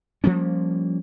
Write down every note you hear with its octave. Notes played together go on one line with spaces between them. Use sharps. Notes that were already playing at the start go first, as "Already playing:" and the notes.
F3 G3 A#3 C#4